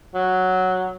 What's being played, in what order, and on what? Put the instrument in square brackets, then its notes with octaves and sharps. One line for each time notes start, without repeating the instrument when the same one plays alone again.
[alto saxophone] F#3